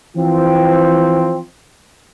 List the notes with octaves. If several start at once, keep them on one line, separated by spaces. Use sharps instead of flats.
E3 F3 C4